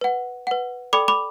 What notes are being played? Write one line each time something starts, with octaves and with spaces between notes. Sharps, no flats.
B4 F#5
B4 F#5
A4 D5 G5 B5 D6
B5 D6